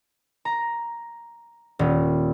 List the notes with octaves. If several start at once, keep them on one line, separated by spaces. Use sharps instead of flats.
A#5
D#1